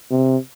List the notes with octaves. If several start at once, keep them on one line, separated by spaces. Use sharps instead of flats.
C3